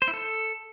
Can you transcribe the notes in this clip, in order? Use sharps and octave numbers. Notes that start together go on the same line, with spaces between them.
C5
E4
A4